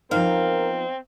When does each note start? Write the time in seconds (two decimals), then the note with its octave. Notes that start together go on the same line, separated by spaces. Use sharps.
0.11 F3 B3 C4 D#4 A#4 F5